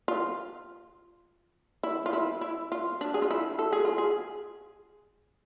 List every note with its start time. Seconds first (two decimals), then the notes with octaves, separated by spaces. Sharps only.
0.08 F4
1.83 E4
2.06 F4
2.13 E4
2.41 E4
2.72 F4
3.01 D4
3.14 G#4
3.22 F4
3.31 E4
3.59 A4
3.73 G#4
3.85 F4
3.98 G#4